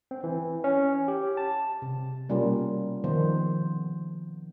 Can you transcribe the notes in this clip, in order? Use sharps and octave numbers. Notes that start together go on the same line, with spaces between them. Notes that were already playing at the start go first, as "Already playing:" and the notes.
C4
E3
C#4
G4
A5
C3
B2 G3 A#3 C#4 F4 A#4
D#3 F3 B3 C5